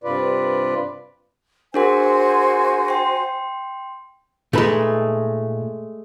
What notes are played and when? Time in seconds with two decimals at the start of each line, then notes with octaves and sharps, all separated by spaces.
0.04 G2 C3 F4 B4 D5
1.74 D4 F#4 G#4 A#4 C5 G#5
2.88 G5 C6
4.53 A#2 G#3 A3 D#4 B4